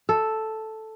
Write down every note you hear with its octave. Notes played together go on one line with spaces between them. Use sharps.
A4